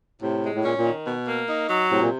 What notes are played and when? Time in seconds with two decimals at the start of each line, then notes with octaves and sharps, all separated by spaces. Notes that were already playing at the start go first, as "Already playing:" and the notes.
0.21 A2 C3
0.43 G#3
0.55 A2
0.63 A#2 C#4
0.78 A#2
0.85 D#3
1.06 B2
1.27 A#3
1.48 D#4
1.69 F#3
1.90 A2 C3
2.01 A#2